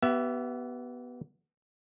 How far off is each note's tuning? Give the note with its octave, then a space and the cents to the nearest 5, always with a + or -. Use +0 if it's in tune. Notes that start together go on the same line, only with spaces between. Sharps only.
B3 +0 G4 -35 E5 +20